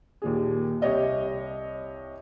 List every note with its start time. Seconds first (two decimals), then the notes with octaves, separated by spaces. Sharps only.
0.22 D#2 A#2 G#4
0.81 C2 G4 C#5 D#5 E5